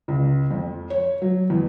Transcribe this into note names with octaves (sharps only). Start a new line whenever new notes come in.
C#2
F2
C#5
F#3
E2